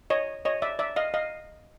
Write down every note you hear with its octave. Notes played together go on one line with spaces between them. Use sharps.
C#5 D#5
C#5 D#5
D5 E5
D5 E5
D#5 F5
D#5 F5